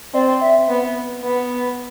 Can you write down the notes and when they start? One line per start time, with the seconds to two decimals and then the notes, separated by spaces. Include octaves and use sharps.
0.14 C4 D5
0.41 E5
0.69 B3
1.23 B3